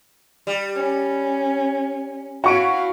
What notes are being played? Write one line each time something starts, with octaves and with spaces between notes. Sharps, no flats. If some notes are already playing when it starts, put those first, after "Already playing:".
G3
C#4
C#4 E4 F#4 F5 C#6 D7